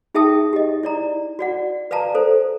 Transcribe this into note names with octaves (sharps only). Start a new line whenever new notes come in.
D#4 G#4 E5 G5 A5 D#6
G4 D#5
E4 D5 A#5
F#4 D5 F#5
B4 D5 F5 A5 A#5
A4 C5